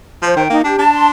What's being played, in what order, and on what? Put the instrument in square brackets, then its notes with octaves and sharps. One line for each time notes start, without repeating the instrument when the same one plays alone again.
[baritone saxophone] F3 [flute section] C5
[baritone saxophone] D#3 [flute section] G5
[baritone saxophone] A#3 [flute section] D#4
[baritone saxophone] D4 [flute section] G4
[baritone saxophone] D4 [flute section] A5
[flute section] C6